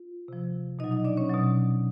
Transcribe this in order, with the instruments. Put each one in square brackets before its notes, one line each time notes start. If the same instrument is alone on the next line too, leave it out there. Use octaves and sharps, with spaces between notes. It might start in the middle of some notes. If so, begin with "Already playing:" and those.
Already playing: [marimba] F4
C3 F3
B2 D#4 D#5
F#3
D#4 D#5
D4 D5
C#4 C#5
B2 F#3